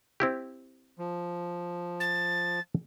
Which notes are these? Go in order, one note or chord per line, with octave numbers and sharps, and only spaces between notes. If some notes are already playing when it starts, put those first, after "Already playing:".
C4 E4 G4
F3
A6